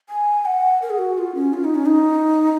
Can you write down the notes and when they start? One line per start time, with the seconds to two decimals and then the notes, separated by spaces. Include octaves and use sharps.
0.09 G#5
0.45 F#5
0.82 A#4
0.90 G#4
0.99 F#4
1.18 F4
1.35 C#4
1.54 F4
1.64 D#4
1.75 C#4
1.86 D#4